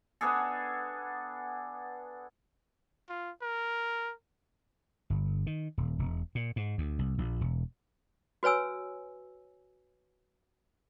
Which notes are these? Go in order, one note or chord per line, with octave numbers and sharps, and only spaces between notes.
B3 D4 G#4 A4
F4
A#4
G1
D#3
D#1
E1
A#2
G#2
D2
C2
A#1
E1
F#4 B4 C#5 G#5 E6